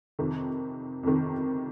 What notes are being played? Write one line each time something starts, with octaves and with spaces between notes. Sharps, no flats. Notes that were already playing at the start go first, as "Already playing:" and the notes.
F2 C3 D#3
F2 C3 D#3